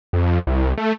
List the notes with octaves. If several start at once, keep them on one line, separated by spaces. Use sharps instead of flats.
F2
C2
A3